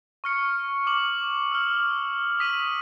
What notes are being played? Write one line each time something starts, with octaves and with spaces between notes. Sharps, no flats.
C#6 F6 C#7
D6 F#7
E6 F6
D#6 B6 D#7 F#7